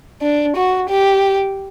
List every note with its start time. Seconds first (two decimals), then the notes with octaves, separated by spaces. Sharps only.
0.22 D4
0.57 F#4
0.90 G4